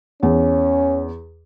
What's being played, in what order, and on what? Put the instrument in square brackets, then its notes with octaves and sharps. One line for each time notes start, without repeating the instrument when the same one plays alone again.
[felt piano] E2 [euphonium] C#4